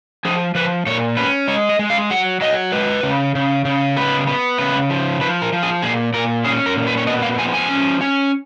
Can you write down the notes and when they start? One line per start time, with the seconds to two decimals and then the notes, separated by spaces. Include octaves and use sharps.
0.25 F3 G#4
0.55 F3 B4
0.86 A#2 C#5
1.17 C#4 B4
1.48 G#3 C#5
1.69 D#5
1.79 G#3
1.90 F5
2.10 F#3 F#5
2.41 F#3 D#5
2.72 G#3 B4
3.03 C#3
3.35 C#3
3.65 C#3
3.97 B3 B4
4.27 B3
4.58 C#3 B4
4.90 F3
5.21 F3 B4
5.42 A#4
5.52 F3
5.63 G#4
5.82 A#2 G#4
6.13 A#2 A#4
6.45 C#4 G#4
6.66 A#4
6.76 A#2
6.87 B4
6.98 C#5
7.07 B3 D#5
7.22 F5
7.38 F3 G#5
7.54 G#5
7.69 C#4
8.01 C#4